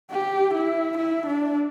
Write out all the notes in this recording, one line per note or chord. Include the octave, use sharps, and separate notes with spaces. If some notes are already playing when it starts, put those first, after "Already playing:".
G4
E4
E4
D4